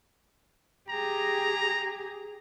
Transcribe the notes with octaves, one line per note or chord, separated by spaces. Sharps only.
G4 G#4 A#5